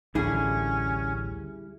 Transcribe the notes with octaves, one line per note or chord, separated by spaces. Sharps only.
A1 D2 D3 G3 C#4 E4 G#4